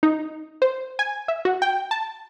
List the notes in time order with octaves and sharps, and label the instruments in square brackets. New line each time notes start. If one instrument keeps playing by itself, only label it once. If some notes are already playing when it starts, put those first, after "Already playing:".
[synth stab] D#4
C5
G#5
E5
F#4
G5
A5